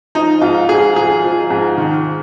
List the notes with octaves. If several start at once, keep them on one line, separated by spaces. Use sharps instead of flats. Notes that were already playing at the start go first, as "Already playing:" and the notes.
F3 D#4
G#2 F4
G#2 G#4
F3 G#4
F3
G#2
D#3